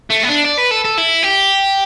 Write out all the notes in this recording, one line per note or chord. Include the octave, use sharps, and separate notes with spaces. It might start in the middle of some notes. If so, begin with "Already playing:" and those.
A3
B3
D4
D5
B4
A4
A4
E4
G4